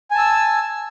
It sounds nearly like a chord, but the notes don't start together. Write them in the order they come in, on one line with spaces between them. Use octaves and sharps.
G#5 A5 E6